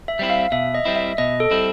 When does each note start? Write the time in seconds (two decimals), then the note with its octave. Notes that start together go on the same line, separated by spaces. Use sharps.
0.08 E5
0.19 G3 C4 E4
0.30 F5
0.52 B2 E5
0.74 D#5
0.85 G3 C4 E4
0.96 E5
1.18 B2 D#5
1.40 A4
1.51 G3 C4 E4